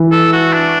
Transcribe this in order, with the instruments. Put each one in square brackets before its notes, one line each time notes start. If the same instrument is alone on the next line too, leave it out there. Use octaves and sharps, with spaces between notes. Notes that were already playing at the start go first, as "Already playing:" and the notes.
Already playing: [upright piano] E3
[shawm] A4
F#4
D4